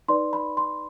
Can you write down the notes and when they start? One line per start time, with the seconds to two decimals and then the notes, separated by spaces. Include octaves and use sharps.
0.08 D#4 B4 D5 C6
0.33 B5
0.57 C6